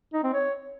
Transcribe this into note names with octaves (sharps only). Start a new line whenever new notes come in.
D#4
C4
C#5